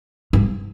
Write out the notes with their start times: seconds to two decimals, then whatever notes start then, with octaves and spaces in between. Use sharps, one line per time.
0.33 G2